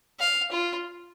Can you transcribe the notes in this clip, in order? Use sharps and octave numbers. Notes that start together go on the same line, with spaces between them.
F5
F4